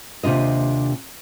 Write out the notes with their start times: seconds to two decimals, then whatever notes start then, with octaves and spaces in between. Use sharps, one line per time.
0.23 D#2 C3 D4 F4 D#5